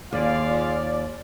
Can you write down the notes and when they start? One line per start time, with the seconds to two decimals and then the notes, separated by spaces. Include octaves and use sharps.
0.13 D#2 F4 G#4 D5 F5